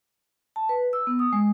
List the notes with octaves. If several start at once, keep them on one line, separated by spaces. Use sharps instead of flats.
A5
B4
E6
B3
D#6
G#3